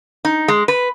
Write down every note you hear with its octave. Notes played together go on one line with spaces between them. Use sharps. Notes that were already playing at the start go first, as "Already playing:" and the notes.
D#4
G#3
B4